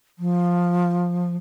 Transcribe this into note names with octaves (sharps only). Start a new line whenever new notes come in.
F3